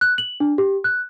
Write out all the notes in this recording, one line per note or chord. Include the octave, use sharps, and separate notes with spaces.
F#6
F#7
D4
G4
F#6